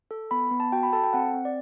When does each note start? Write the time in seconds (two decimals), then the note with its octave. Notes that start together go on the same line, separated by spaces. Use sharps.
0.11 A4
0.31 B3 B5
0.51 B3
0.60 A5
0.72 F#4 G5
0.83 B5
0.93 A4 A5
1.04 G5
1.13 C4 F#5
1.34 C4
1.45 D5